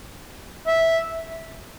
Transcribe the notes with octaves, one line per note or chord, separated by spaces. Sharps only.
E5